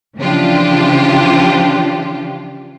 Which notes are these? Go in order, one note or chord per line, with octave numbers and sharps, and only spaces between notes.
C#3 E3 F3 D4 F4 G4